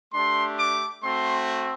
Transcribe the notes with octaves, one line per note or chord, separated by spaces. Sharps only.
A3 D4 G4 C6
D6
A3 C4 F#4 C6